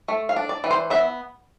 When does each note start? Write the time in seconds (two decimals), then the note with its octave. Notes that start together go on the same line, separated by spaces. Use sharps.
0.08 A3
0.29 F5
0.36 D4
0.49 D5
0.64 E3
0.71 C5
0.90 B3 E5